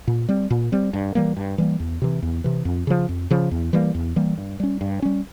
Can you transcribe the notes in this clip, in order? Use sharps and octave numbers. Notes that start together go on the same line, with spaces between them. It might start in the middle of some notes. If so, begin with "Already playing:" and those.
A#2
G3 C4
A#2
G3 C4
G2
E3 G3 A#3
G2
E3 G3 A#3
E2
C3 E3
E2
C3 E3
F2
C#3 F3
F2
C#3 F3
E2
E3 G3 A#3
E2
E3 G3 A#3
G2
G3 C#4
G2
G3 C#4